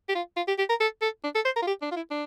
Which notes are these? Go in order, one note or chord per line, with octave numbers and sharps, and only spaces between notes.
G4
F4
F4
G4
G4
A#4
A4
A4
D4
A4
C5
A#4
F4
G4
D4
F4
E4
D4